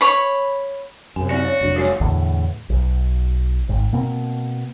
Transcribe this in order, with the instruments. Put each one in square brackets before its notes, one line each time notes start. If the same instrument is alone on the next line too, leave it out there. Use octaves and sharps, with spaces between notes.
[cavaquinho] C#5 B5
[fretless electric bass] F#2 C3 [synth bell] G#5
[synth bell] C4 D5 [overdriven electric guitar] F#4
[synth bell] C#5
[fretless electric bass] F1 F#3 D4
[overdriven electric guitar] C#2 G#2 [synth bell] F#4 C#5 C7
[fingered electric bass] E2 A2 D3
B1
G#1 G#2
B2 A#3 C4